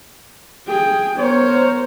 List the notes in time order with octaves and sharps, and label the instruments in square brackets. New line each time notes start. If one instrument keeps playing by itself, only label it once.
[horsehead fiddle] G#4 G5
[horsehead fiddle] B3 C5 [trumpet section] A#4 C#5